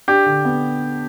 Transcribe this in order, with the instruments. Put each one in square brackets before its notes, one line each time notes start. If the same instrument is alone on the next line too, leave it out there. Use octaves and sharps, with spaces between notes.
[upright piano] D4 [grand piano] G4
[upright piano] D3
B3